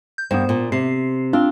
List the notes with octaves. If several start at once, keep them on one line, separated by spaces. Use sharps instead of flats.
G6
G2 A#3 B3 C5
A#2
C3 C7
C4 D4 F4